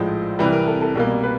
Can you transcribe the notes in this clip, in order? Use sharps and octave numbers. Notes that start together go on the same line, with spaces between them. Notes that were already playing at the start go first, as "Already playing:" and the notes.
Already playing: A#1 A2 F3 G#3 C5
C2 C3 E3 G3 B4
A#4
A4
A4
C2 B2 G3 A#3 A#4
B4